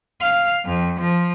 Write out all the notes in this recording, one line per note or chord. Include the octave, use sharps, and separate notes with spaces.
F5
F2
F3